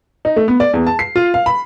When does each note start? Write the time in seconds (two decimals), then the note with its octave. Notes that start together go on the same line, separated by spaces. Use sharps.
0.25 D#4
0.36 A3
0.48 B3
0.60 D5
0.73 E2
0.87 A5
0.99 C7
1.16 F4
1.34 F5
1.46 B5